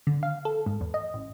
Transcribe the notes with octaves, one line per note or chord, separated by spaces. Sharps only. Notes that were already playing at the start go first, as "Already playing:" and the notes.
D3
F5
A4
G#2
E2
D#5
A1